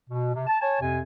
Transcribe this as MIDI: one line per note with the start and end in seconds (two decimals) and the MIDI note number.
0.08 0.31 47
0.34 0.46 48
0.47 0.58 81
0.60 0.79 73
0.60 0.79 80
0.60 0.79 81
0.80 1.00 41
0.80 1.00 48
0.80 1.00 80